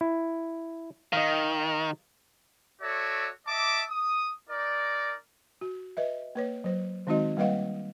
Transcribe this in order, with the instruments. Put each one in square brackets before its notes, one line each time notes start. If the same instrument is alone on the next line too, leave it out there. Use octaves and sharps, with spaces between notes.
[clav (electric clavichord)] E4
[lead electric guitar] D#3 [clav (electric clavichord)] D#5 F5
[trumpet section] F#4 A4 C#5 D5 E5
D#5 E5 A5 D6
D#6
D#4 A#4 D5
[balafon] F#4
B4 D#5 E5
A#3 B4 C#5
F#3 C5
D#3 G#3 C4 D#4 F#4 D#5
G3 A#3 B4 D#5 F5 F#5